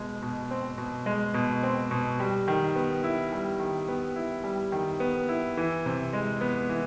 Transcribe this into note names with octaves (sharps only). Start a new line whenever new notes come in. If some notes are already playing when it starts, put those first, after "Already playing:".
Already playing: B2 G#3
B2
C4
B2
G#3
B2
C4
B2
G3
D#3
B3
E4
G3
D#3
B3
E4
G3
D#3
B3
E4
E3
C3
G#3
B3
E3